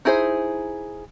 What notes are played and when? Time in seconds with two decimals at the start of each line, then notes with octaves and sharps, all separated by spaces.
0.05 D#4 E4 G#4 A#4 C5